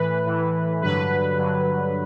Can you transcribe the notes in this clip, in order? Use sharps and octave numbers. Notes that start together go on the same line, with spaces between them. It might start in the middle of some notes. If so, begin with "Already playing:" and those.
Already playing: A2 E3 B4
A2 E3
G2 D3 F#3 B4
G2 D3 F#3